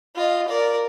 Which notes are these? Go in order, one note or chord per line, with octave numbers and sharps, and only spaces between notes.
F4 D#5
A#4 D5